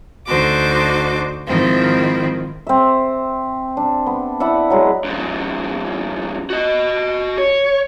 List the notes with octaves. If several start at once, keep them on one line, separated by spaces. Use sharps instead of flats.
D2 D3 D#4 F#4 C5 D6
G#2 D#3 F3 C4 E4
C4 E5
D4
B3
E4 D5 E5 F#5
F#3 G#3
F2 G#2
F#4 D#5
C#5